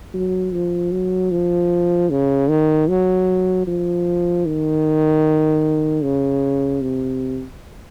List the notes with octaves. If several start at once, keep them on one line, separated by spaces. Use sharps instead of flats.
F#3
F3
F#3
F3
C#3
D#3
F#3
F3
D#3
C#3
C3